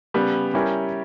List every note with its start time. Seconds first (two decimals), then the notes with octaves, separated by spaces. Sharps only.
0.14 C#3 G3 B3
0.54 G3 C#4 E4 G4 A#4